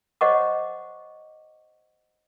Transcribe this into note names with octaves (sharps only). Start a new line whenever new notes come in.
C5 C#5 D#5 F#5 C#6 D6